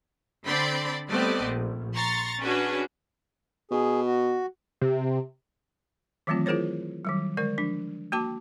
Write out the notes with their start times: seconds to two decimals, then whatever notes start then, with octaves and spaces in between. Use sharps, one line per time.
0.45 D3 C4 D5 B5 C6
1.10 G3 A3 B3 C4 D5 D#5
1.44 A#1
1.95 A#5 C6 C#6 A6
2.41 C#4 D4 F#4 G#4 B4
3.71 B2 G#4
4.05 F#4
4.81 C3
6.27 D#3 E3 F#3 A3 C4 F4
6.46 E4 F4 G#4 A#4 C5 C#5
7.05 D#3 F#3 G3
7.37 D3 G#3 A#4 D5
7.58 F3 D4
8.12 A#3 F#4 G5 A5 D6